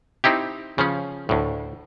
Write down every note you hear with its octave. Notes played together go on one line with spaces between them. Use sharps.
C4 D#4 E4 G4
C#3 F3 C#4
D2 A2